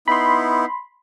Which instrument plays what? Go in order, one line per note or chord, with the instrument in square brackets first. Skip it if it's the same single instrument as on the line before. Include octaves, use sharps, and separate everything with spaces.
[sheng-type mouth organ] B3 D#4 E4 [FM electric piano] B5 C6